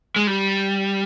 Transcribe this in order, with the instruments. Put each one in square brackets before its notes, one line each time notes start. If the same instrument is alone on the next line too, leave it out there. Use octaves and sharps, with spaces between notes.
[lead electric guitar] G#3
G3